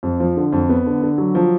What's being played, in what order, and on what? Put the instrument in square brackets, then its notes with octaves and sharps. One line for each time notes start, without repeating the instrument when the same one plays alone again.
[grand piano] F2
F3
D3
F2
B3
D3
D3
F#3
F3